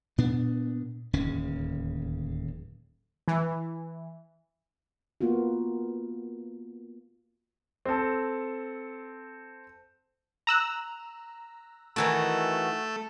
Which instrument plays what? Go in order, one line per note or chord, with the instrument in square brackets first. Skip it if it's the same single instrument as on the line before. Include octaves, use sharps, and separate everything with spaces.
[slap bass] A#2 B3 D4
D1 D#2 C#3 C#4
[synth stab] E3
[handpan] A#3 B3 F4 F#4
[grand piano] C4 A4
[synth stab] A#5 E6 F#6
[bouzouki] D#3 E3 F#4 [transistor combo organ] A3